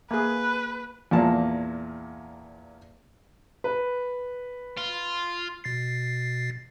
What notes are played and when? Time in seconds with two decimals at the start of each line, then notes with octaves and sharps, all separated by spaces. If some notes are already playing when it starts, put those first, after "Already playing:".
0.11 A#3 G#4 B4
1.11 E2 A#2 A#3 A5
3.64 B4
4.78 F4
5.64 B2 A6 C7